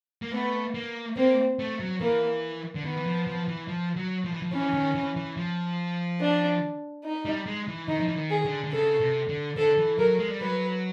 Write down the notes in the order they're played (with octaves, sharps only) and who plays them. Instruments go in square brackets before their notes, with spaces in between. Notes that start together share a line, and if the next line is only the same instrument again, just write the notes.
[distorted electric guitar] A#3
[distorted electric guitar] A3 [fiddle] B3
[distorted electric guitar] A#3
[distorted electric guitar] A#3 [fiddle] C4
[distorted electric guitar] A3
F#3
[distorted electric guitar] E3 [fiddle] A#3
[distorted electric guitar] D3
[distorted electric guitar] D#3 [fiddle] B3
[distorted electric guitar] E3
F3
F3
E3
F3
F#3
F3
E3
F3
[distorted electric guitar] E3 [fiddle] C#4
[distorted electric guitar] D#3
E3
E3
F3
[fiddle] D4
D#4
[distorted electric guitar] G3
G#3
E3
[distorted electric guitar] D#3 [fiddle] D#4
[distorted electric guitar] F3
E3
D#3
[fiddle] G#4
[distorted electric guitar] D3
D3
[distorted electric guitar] C#3 [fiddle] A4
[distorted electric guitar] C3
D3
[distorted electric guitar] D3 [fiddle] A4
[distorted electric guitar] E3
[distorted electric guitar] F#3 [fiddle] A#4
[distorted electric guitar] G#3
G3
[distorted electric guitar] F#3 [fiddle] B4